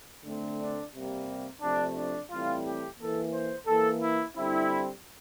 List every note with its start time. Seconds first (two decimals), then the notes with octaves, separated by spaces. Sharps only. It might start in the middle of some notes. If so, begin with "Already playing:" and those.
0.24 D3 A3 C4
0.59 D4
0.93 C3 G3 A#3
1.61 C3 F3 A3 D4
1.95 D4
2.30 A2 E3 G3 C4 F4
2.64 G4
2.98 E3 A#3 A4
3.33 C5
3.67 E3 A#3 A4
4.01 E4
4.35 D3 G3 C4 E4